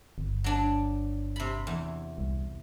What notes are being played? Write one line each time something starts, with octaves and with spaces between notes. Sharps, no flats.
G1
F#3 D4
C3 B5
E2
C2